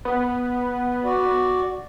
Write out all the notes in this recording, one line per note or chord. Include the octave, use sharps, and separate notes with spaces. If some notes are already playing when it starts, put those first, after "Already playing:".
B3
F#4 D5